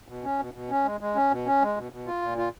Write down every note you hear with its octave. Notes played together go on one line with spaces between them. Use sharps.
B2
C#4
B2
B2
C#4
G#3
G#3
C#4
B2
C#4
G#3
B2
B2
F4
A#2
F4